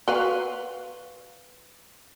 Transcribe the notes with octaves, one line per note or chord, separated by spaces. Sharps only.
F#4 B4 F5